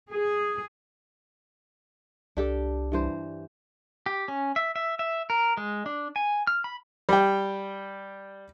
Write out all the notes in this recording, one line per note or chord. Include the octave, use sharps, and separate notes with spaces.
G#4
C2 D4 G4 A4
G2 E3 C5
G4
C#4
E5
E5
E5
A#4
G#3
D4
G#5
F6
B5
G3 G5